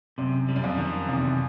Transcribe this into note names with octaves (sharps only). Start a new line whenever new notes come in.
F#2 C3
G3
F#2
F2
D#3
E2 C3